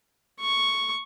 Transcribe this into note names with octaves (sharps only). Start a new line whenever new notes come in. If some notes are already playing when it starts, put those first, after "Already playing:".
C#6